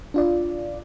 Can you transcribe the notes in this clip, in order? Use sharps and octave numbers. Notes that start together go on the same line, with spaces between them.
D4 F4 D5